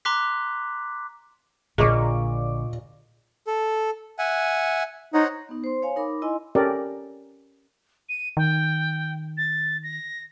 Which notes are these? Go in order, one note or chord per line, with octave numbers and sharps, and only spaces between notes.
A#5 C6 D6 F#6 B6
A#1 A#2 D3 G#4 D#5 C#6 D6
A4
E5 F#5 G#5
D#4 C5 C#5 F#5
B3 D#4
C5 C6
C#5 F5 G#5
D#4 A#4 B5 D6
E4 D#5 G#5 C6
C#4 G4 A4 A#4 D5 D#5
D#7
D#3 G5
A6
A#6